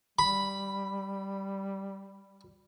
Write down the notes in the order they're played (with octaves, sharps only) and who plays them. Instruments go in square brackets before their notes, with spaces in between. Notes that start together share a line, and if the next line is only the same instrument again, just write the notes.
[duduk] G3 [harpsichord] B5